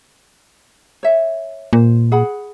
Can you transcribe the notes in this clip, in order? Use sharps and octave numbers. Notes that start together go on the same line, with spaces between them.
C#5 E5
A#2 C5
G#4 F#5 B5